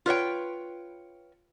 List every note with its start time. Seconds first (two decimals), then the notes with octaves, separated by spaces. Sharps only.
0.06 F4 B4 C#5 G5